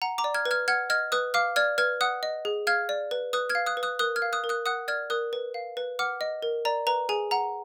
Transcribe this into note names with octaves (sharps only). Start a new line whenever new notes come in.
F#5 A#5
A#5 D6
D5
F6 G#6
B4
F6 G#6
F#5 F6 G#6
D#5 F6 G#6
B4 D#6 F#6
F5 D6 F6
D5 F6 G#6
B4 F6 G#6
F#5 D#6 F#6
D#5
G#4
F5 F6 G#6
D5
B4
B4 D#6 F#6
F6 G#6
F5
D#6 F#6
B4
D#6 F#6
A#4 D#6 F#6
F6 G#6
F5
D#6 F#6
A#4
D#6 F#6
F#5 D#6 F#6
D5 F6 G#6
A#4 D#6 F#6
B4
F5
B4
F#5 D6 F6
D#5
A#4
D5 A#5
B4 A#5
G#4 G#5
F#5 A#5